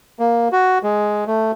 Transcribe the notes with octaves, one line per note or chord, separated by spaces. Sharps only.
A#3
F#4
G#3
A3